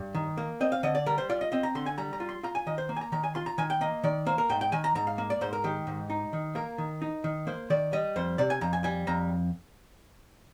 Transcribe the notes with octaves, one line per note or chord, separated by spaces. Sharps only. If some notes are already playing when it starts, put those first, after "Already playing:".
Already playing: G2
D#3
A#3
C4 D#5
F5
D3 D#5
D5
G3 A#4
C5
F4 D5
D#5
C4 D#5
A#5
D3 C6
G#5
G3 A#5
A#5
F4
C6
F4 A#5
G#5
D#3 D#5
C5
A#3
G#5
A#5
D#3 A#5
G#5
F4 C6
A#5
D#3 G#5
G5
A#3 D#5
D#3 D5
A#3 C5
A#4
G#2 G5
G5
D#3 G#5
A#5
G#2 A#5
F5
A#3
D5
G#2 C5
A#4
D#3 G4
G#2
D#4
D#3
A#3 A#4
D#3
D#4
D#3
A#3 C5
D#3 D5
G3 D#5
F2 C5
C3 D5
G#5
F2 A#5
G#5
G3 G#5
F2 A#5